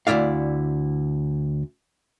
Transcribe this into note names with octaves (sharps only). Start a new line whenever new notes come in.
D2 G#2 E4 D5 F5